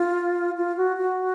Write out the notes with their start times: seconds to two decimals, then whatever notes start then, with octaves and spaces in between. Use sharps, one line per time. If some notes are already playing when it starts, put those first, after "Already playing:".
Already playing: F4
0.57 F4
0.77 F#4
0.96 F#4